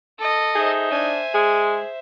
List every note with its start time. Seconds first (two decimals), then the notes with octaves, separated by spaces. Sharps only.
0.19 A4 D#5
0.55 D#4 G#4 C5 E5
0.92 D4 G#5
1.35 G#3 G#4